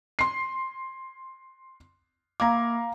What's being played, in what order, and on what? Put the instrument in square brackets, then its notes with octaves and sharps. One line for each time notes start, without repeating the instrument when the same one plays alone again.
[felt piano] C6 C7
[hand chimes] A#3 D6 [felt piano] F5 A#5